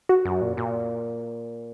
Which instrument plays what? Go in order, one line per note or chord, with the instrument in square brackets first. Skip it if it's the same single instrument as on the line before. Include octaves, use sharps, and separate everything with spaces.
[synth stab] F#4
[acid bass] F#2
A#2
A#2